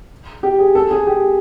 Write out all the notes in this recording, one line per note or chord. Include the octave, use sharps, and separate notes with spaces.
G4
G#4
A4
G#4
G4